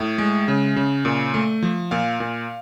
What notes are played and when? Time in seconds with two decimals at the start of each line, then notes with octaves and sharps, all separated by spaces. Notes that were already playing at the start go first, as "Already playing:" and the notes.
Already playing: A2 E5
0.18 G#3
0.48 C#3
0.76 C#3
1.05 A#2
1.34 A3
1.62 F3
1.91 A#2 F5
2.20 A#2